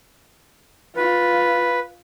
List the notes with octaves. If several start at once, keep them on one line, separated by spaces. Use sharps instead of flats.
F4 B4